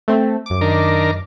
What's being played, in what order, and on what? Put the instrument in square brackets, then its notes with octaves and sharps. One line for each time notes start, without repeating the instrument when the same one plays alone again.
[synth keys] A3 C4
F#2 D6
[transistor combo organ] D#3 D4 A#4